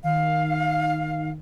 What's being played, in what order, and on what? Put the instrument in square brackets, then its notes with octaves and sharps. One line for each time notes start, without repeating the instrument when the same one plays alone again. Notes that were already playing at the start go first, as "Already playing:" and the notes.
[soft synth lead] D#3 [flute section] F5